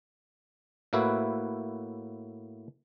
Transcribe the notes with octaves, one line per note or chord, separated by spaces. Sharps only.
A2 A#3 E4 F#4 B4 E5